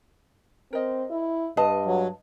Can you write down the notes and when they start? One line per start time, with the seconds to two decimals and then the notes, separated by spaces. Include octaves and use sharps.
0.73 C4 A#4 D#5
1.11 E4
1.57 G2 B4 D#5 F5 A5
1.86 F#3